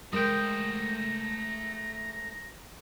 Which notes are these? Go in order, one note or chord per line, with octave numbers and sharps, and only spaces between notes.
G#3 A3 A#4 C5 D#5 G5 A#5